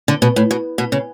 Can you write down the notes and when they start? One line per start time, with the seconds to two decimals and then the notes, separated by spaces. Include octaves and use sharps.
0.08 D3
0.22 B2
0.36 A2
0.51 B2
0.78 B2
0.92 C#3